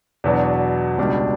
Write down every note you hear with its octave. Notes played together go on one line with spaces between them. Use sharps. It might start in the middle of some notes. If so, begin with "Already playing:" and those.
E2 B2 F#3 B3 D4
C#2 B2 G3 D4